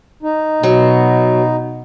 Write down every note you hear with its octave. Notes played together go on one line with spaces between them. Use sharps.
D#4
B2 F#3